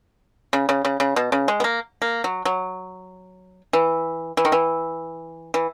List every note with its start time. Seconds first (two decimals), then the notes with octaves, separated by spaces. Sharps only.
0.53 C#3
0.69 C#3
0.85 C#3
1.00 C#3
1.16 B2
1.32 C#3
1.48 G#3
1.60 B3
1.64 A#3
2.02 A#3
2.24 F#3
2.45 F#3
3.73 E3
4.37 E3
4.45 D#3
4.52 E3
5.54 E3